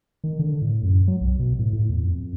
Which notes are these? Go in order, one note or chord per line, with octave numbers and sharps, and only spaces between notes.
D#3
D3
A2
F#2
F#3
B1
B2
A2
A2
E2
F2